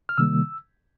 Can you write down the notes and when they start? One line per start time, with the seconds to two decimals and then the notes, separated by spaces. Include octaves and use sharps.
0.09 F6
0.18 C3 D#3 G3 A#3 E6